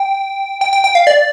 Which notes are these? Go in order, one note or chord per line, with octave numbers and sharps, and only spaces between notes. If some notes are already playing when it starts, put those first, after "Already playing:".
Already playing: G5
G5
G5
G5
F5
D5